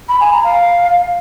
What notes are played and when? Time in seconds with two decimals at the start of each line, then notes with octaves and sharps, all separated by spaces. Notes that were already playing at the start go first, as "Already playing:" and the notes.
0.09 B5
0.20 G#5
0.32 A#5
0.44 F5